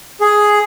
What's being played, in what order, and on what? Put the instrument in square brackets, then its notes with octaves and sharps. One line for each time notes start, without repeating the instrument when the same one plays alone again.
[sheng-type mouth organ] G#4